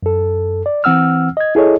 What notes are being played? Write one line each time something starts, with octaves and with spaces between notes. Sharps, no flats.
F#2 A4
D5
E3 C4 F#5 E6 F6
D#5 G#6
E4 G#4 A4 C#5 D#5